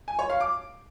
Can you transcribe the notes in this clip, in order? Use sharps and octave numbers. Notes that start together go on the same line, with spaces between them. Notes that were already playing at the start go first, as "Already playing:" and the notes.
G#5
C#5
F5
D6